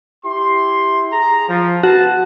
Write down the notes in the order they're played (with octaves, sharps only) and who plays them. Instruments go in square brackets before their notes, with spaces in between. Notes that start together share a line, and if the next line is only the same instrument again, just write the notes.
[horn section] E4 G4 C6
G#4 A#5
F3
[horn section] B3 A5 [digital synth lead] F#4